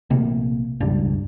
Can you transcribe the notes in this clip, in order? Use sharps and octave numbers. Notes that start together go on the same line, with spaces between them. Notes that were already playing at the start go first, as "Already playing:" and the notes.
A#1 C3 A3 A#3
E1 C#2 G2 D4